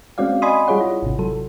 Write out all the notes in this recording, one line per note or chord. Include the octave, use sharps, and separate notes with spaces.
G#3 C4 C#4 F#4 D5 F5
D5 D#5 G#5 B5 C6 D#6
G3 F4 G#4 C#5 F#5
E4
G#1 C3
F#3 A4